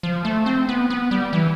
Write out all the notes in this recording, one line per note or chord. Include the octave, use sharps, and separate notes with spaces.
F3
A3
C4
B3
B3
G3
E3